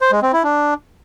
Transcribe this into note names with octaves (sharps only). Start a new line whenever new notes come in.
C5
G#3
C4
E4
D4